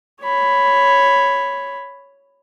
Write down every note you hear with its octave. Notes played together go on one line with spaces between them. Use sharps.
C#5 B5